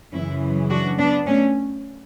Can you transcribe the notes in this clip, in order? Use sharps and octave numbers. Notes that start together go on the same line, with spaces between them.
F#2 C#3 E3 C#4 E4
D4 F#4
B3 D4
A3 C#4